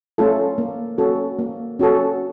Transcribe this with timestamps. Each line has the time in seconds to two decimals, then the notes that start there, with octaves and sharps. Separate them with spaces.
0.18 A3 C#4 F4 A4
0.58 A#3
0.98 C#4 F#4 A4
1.39 A#3
1.79 C#4 F#4 A4